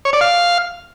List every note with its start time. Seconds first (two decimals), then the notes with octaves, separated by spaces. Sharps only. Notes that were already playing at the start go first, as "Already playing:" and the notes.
0.05 C#5
0.13 D5
0.21 F5